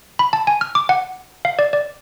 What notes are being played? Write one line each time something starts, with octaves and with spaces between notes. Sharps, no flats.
B5
A5
G#5
F6
D6
F#5
F5
D5
D5